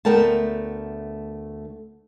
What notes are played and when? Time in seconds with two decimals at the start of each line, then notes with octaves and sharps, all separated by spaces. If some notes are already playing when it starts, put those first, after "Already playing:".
0.05 D2 A3 B3 A#4 G5 A5